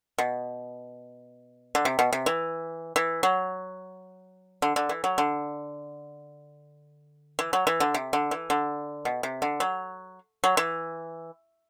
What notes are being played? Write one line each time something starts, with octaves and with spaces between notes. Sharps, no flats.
B2
D3
C3
B2
C3
E3
E3
F#3
D3
D3
E3
F#3
D3
E3
F#3
E3
D3
C3
D3
E3
D3
B2
C3
D3
F#3
F#3
E3